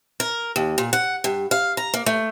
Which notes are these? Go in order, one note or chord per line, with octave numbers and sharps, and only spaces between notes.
A#4
D#2
A#2
F#5
G2
F5
A#5
A#3
A3